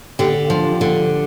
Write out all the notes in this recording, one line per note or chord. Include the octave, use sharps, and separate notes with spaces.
D3 G4
F3
D3